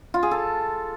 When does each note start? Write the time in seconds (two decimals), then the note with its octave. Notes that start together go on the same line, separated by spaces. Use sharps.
0.14 F4
0.23 G#4
0.31 A4